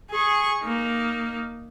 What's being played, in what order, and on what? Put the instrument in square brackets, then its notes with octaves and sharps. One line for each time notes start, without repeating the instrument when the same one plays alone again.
[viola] G#4 C#6
A#3 D#4